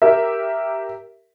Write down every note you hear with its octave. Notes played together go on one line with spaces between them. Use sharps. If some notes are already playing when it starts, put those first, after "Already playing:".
G4 A#4 E5